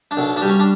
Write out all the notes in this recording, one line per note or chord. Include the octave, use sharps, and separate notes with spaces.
D4
B1
D4
G3
C#4
D4